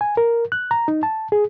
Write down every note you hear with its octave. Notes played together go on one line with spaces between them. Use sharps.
G#5
A#4
F#6
A#5
D#4
A5
G#4